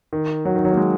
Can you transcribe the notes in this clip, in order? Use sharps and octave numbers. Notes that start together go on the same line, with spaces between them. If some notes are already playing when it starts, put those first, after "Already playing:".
D#3
F#3
D#3
F#3
A#3
G#3